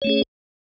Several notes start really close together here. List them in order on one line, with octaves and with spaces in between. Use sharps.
C#5 A3 C#4 G#4